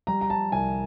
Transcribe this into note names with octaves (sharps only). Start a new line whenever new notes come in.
G3 A#5
A#5
A5
C2 G#5